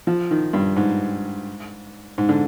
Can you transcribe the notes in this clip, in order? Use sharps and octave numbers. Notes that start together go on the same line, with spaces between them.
F3
D#3
G2
G#2
G#2
D3